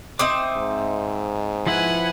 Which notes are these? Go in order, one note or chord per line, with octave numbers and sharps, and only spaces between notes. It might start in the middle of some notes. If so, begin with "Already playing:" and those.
C4 D#4 E5 D6 D#6
G#2
F3 E4 B4 F#5 G#5